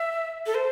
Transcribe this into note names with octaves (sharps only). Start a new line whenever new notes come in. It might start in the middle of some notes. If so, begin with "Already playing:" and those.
Already playing: E5
A4
C5